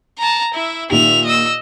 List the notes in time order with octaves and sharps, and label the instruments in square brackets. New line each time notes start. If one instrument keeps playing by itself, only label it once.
[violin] A5 A#5
E4 E5
[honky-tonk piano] A#2 D#3 G4 [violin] E5 F7
[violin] D#5 E6